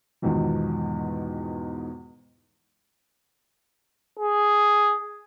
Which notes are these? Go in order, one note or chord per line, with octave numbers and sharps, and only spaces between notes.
E2 G#2 B2 D#3 F3
G#4